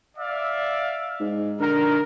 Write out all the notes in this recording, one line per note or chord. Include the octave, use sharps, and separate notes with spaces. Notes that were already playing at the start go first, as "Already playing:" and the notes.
D5 E5 F5
G#2
D3 A#4